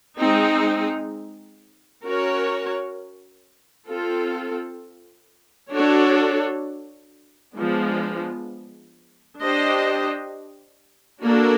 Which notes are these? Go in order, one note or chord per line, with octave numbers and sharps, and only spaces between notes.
G#3 C4 D#4
C#4 F#4 A#4 C#5
C4 F4 A4
D4 F#4 A4 C#5
F3 G#3 B3 D4
D4 G4 C5 D#5
A#3 D4 F#4 A4 D5